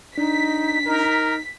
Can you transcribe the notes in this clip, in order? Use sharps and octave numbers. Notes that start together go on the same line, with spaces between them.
D4 D#4 B6
D#4 A#4